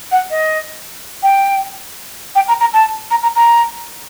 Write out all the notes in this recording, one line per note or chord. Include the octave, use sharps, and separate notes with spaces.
F#5
D#5
G5
G5
A#5
A#5
A5
A#5
A#5
A#5